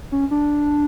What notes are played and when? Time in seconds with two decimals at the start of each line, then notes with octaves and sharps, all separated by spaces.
0.12 C#4
0.31 D4